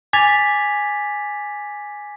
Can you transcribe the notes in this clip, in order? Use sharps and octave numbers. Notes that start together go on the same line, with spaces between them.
G#5 D6 G#6 A6 B6 F7